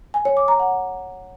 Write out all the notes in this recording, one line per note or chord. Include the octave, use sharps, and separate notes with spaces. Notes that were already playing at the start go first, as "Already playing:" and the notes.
G#5
C#5
D6
A#5
F#5